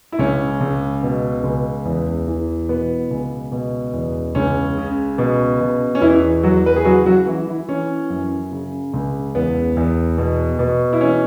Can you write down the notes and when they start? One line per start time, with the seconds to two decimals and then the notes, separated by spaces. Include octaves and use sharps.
0.12 E4
0.19 C#2 C#4
0.61 C#2
1.03 B2
1.44 C#2
1.85 E2
2.27 E3
2.69 B2 B3
3.11 C#2
3.52 B2
3.93 E2
4.35 C#2 C#4
4.78 C#3
5.18 B2
5.61 B2
5.95 C#4
6.01 E2 E3 E4
6.43 E3 F#3 F#4
6.66 B4
6.76 G#4
6.85 C#3 F#3 F#4
7.06 F#3 F#4
7.26 E3 E4
7.47 E3 E4
7.69 E3 C#4
8.10 F#2
8.52 C#3
8.94 C#2
9.35 E2 B3
9.77 E2
10.18 B2
10.59 B2
10.93 E4
11.01 E3 C#4